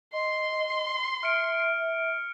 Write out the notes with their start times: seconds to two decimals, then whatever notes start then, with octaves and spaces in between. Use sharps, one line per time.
0.13 D#5 C6
1.23 E5 F6 C#7 D7